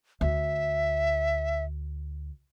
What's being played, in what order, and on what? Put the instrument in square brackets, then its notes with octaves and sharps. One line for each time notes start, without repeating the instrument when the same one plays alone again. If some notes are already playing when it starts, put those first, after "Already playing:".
[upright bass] D2 [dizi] E5